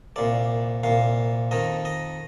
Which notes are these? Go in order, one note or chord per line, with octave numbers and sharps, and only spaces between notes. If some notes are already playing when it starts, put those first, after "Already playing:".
C2 A#2 D5
C2 A#2 F5
F2 D#3 D#5
D#5